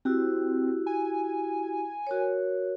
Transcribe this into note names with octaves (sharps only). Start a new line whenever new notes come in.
C4 E4 F#4 G4
G#5
F#4 A#4 C#5